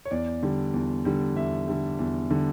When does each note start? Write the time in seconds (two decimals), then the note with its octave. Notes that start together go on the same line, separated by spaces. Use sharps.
0.05 C#5
0.11 E2 D5
0.43 D3 G3
0.74 E2
1.05 D3 G3
1.36 E2 E5
1.68 D3 G3
1.99 E2
2.31 D3 G3